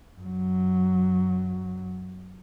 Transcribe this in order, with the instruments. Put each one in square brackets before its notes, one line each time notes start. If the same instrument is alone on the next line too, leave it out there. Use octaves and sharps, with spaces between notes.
[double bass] F#2 F#3